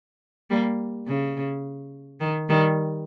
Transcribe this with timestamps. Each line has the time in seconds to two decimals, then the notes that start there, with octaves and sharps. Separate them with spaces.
0.51 G3 A#3
1.08 C#3
2.20 D#3
2.49 D#3 G3